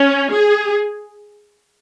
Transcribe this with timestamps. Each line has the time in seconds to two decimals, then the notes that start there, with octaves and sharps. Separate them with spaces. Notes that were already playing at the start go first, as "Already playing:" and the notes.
Already playing: C#4
0.32 G#4